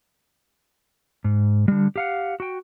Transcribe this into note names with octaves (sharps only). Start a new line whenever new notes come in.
G#2
D3 G3
G4 F5 F#5
F#4 G5